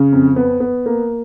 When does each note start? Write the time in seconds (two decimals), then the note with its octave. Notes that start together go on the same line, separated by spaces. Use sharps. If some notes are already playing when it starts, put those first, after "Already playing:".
Already playing: C#3
0.12 F2
0.36 B3
0.60 B3
0.86 A#3